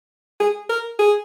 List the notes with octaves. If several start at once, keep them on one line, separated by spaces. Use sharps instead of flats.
G#4
A#4
G#4